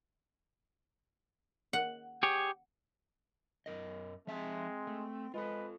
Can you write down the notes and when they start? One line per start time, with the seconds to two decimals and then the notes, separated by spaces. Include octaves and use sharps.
1.73 F#5
2.23 G4 G#4 C#5
3.66 F#2 A#4 D#5
4.27 F3 G#3 C4 E5 A5
4.87 A3
5.34 G#3 F4 A4 B4